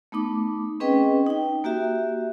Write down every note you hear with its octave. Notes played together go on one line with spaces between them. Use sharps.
A3 B3 D#4 D6
C4 C#4 G#4 B4 D#5 G5
D#4 G5
A#3 F#4 G4 E5